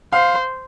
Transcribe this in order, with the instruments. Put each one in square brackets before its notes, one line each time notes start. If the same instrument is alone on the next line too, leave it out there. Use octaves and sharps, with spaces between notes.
[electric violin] C5 [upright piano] F5